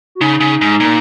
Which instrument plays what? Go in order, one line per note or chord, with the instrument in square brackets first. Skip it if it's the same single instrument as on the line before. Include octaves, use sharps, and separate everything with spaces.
[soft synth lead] F#4
[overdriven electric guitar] C#3 [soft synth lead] D#4
[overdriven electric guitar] C#3
G#2
A#2